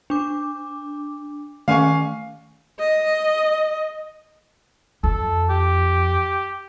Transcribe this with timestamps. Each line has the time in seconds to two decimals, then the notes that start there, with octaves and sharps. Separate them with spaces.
0.10 D4 D6
1.68 D#3 A3 C#4 F5 G#5 C#6
2.79 D#5
5.03 F2 A4
5.49 G4